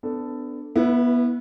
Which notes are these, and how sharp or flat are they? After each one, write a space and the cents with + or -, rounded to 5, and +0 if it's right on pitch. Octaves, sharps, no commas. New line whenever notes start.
B3 +25 D4 +0 A4 +5
B3 -25 E4 +0 B4 +10